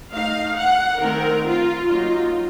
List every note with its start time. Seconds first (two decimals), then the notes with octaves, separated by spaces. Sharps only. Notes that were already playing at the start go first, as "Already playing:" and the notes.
0.13 A3 D#4 F5
0.58 F#5
1.02 D#3 A3 C4 A#4
1.46 F4
1.90 F#3 A#3 D#4 F4